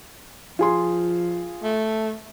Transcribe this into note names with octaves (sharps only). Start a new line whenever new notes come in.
F3 F4 G#4 C6
A3